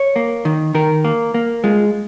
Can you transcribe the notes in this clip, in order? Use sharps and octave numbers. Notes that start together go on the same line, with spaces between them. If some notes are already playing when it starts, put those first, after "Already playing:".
Already playing: C#5
A#3
D#3
D#3 A#4
A#3
A#3
G#3 F4